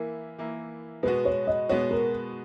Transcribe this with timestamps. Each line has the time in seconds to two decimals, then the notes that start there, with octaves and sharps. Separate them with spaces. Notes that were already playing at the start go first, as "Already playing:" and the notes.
Already playing: E3 A#3 E4 A#4
0.38 E3 A#3 E4
1.03 B2 G#3 B3 F#4 B4
1.25 C#5
1.47 D#5
1.69 B2 G#3 B3 F#4 C#5
1.91 A#4